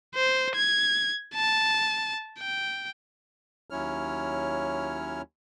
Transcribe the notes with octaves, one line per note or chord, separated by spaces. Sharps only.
C5
G#6
A5
G5
D#2 F#3 C#4 E4 C#5 F6